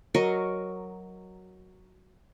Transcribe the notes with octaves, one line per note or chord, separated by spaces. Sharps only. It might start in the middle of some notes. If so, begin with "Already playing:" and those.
F#3 A#4 D#5 C#6